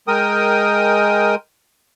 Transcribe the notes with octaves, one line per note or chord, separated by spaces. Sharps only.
G#3 A#4 G5 D#6